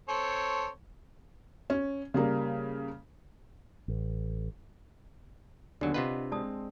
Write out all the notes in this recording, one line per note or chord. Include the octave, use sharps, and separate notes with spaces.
C4 A4 C#5
C#4
C#3 G3 A#3
A1
D#2 D3 F#3 B3 D4 G4 D5
C3 F4 B4 D#5 F#5
G#3 C4 D5 A5 D#6